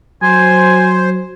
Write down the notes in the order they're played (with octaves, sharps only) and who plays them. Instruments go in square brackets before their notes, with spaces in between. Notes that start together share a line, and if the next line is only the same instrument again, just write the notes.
[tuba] F#3 [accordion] C5 [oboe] G#5